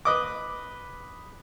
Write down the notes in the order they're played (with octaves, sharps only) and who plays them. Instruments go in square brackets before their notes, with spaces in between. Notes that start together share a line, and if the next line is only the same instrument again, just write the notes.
[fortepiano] B4 D#5 D6